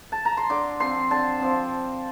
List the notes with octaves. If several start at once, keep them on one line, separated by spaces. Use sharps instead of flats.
A5
A#5
C6
D3 D6
F3 C4 C6
D3 A5
F3 C4